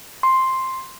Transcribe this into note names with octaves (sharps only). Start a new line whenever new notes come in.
C6